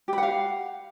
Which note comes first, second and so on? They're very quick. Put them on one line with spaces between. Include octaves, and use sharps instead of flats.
G4 B5 F#5 F5